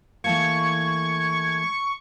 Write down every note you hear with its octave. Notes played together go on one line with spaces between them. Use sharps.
E3 A3 A#3 C#6 G#6